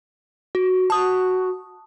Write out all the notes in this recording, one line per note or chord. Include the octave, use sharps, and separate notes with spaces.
F#4
F#4 A5 D#6